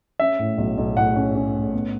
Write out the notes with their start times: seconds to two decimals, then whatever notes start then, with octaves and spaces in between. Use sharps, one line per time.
0.20 C#4 E5
0.39 A2
0.58 B1
0.77 B1
0.96 A2 F#5
1.16 C#4
1.35 C#4
1.54 A2
1.73 B3